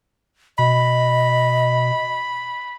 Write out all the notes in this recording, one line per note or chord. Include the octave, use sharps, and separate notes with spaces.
B2 D#5 B5